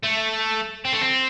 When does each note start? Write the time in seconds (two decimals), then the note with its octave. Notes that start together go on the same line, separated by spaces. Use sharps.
0.04 A3
0.85 C4
0.93 A3
1.02 C4